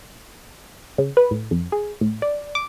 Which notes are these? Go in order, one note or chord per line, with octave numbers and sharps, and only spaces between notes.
C#3
B4
A2
F2
G#4
A2
D5
D6